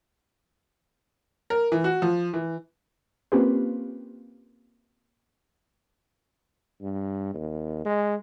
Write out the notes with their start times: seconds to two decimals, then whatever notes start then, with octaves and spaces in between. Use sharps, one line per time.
1.50 A#4
1.72 E3
1.84 F#4
2.02 F3
2.33 E3
3.32 A#3 C4 C#4 F4 G4 B4
6.82 G2
7.34 D#2
7.85 G#3